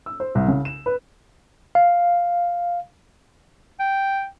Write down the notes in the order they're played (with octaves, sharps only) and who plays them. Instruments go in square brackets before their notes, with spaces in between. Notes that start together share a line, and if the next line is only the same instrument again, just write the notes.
[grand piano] E6
C5
C2
C#3
E7
B4
[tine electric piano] F5
[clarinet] G5